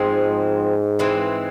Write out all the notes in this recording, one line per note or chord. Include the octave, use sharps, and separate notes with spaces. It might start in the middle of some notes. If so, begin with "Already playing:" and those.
Already playing: G#2 F3 G#3 C4
E3 G#3 C4